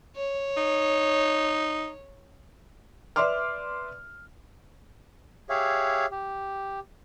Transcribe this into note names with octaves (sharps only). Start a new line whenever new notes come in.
C#5
D#4
B4 D5 E5 C6 D6 F6
G4 G#4 C#5 E5 F5
G4